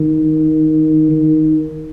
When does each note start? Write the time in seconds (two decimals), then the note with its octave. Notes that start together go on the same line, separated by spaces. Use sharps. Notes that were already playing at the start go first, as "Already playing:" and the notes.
Already playing: D#3
1.11 D#3